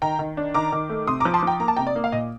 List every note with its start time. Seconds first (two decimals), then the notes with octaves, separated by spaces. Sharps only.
0.02 D#3 G5 A#5
0.19 D#3
0.37 D4
0.54 D#3 A#5 D6
0.72 D#3
0.90 A3
1.07 C3 C6 D#6
1.20 A#5 D6
1.25 F3
1.34 A5 C6
1.43 F3 G5 A#5
1.60 A#3 A#5
1.68 A5
1.77 C3 G5 A#5
1.87 D5
1.96 A#3
2.04 F5
2.12 A#2 D#5